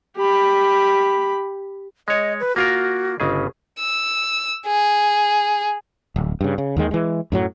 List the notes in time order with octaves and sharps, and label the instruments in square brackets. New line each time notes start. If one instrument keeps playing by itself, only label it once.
[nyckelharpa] G4 B5
[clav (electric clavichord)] G#3 C#5 [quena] D#5
[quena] B4
[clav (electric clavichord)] A#3 F4 A#4 [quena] F#4
[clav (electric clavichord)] G1 C#3 G#4 [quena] D#5
[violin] E6
G#4
[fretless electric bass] D1
G2 C#3
C#3
D#2 D#3 G#3
E3 G#3
F#2 A2 F#3